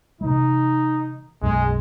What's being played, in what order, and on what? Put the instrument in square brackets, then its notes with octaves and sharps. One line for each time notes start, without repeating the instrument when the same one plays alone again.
[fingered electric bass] C3 E3 G#3 [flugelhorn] D#4
[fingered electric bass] B1 F#2 B2 [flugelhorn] G#3